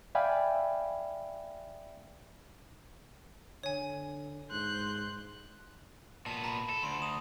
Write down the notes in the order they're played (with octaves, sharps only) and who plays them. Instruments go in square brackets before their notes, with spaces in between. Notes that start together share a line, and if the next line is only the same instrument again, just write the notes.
[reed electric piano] D5 E5 F5 G5 G#5 B5
[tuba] D3 [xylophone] C#5 G#5
[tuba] G#2 [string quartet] C6 F#6 G6
[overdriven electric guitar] A#2 B3 [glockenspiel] A5
[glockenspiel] A#5 B5
[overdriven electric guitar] A4
[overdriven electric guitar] D2 [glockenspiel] C6 D7
[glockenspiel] D#6 F7